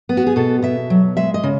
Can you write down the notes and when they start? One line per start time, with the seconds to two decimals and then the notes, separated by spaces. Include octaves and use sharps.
0.09 B3
0.17 F#4
0.27 G#4
0.36 B2 A4
0.62 B2 E5
0.90 F#3
1.17 G#3 E5
1.34 D#5
1.43 C#3